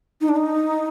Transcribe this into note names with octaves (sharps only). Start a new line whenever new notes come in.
D#4
D4
D#4